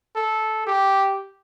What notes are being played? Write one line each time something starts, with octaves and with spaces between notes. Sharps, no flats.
A4
G4